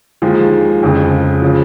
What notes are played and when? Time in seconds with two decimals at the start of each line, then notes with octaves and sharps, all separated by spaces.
0.22 D#2 D#3 F3 G#3
0.83 F2 C#3 F3
1.42 C#3 F3